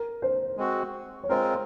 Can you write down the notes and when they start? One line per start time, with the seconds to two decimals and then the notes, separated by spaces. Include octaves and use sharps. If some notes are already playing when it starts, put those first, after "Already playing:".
Already playing: A#4
0.22 C5
0.57 G#3 C4 F#4
1.23 C#5
1.29 G#3 C4 F4 A#4 C5